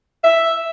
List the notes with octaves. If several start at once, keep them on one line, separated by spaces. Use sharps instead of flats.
E5